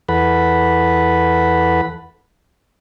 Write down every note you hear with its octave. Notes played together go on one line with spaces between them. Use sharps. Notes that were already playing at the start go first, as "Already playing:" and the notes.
E2 A4 B4 F#5 B5